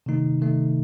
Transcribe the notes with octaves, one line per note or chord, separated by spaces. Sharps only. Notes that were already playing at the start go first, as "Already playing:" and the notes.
C3 D#3 A3 D#4
C3 D#3 A3 D#4